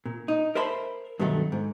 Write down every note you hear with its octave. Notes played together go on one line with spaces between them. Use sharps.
A#2
D#4
A#4 C5 E5 A5 B5 C6
G2 B2 D#3 F#3 A3
G#2